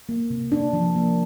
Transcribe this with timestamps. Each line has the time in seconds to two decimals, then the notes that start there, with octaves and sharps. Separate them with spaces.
0.09 A#3
0.30 C3
0.52 C3 D4
0.73 F3
0.96 A#3